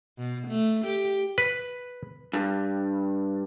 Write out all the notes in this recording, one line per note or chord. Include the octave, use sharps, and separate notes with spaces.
B2
A3
G4
B4
G2